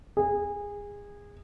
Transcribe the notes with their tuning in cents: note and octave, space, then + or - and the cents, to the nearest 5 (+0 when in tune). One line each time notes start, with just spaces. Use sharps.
G#4 -25